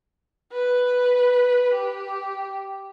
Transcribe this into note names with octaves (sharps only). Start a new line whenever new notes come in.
B4
G4